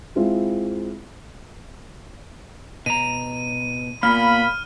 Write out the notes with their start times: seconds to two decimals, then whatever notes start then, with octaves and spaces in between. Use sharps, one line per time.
0.16 G#3 C4 E4 F4
2.86 B2 A#5 D#7
4.03 A#2 A#3 B3 F5 B5 F6